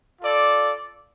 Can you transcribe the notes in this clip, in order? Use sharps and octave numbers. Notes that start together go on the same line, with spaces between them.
F4 A4 D5